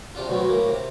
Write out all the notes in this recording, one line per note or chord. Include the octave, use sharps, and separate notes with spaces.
C3 D4 F4
D2 B2 F#3 C4
A2 A#3
C3